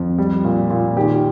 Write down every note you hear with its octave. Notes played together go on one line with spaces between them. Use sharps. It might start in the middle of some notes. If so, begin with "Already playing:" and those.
Already playing: F2
G3
A#2
A#2
D#3 G4